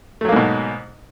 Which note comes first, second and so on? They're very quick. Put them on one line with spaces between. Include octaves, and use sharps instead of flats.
A3 F#3 A#3 G#2 B2